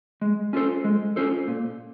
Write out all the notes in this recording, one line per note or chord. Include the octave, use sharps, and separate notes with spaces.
G#3
C#4 F4 A4 C5
G#3
C#4 F4 A4 C5
A#2